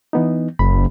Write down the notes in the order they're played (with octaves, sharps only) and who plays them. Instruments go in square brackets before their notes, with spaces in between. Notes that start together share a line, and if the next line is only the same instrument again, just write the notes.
[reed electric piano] E3 B3 D#4
[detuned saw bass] F#1 [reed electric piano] B5